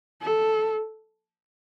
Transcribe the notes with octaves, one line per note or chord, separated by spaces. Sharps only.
A4